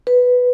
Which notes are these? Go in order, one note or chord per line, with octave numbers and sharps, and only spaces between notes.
B4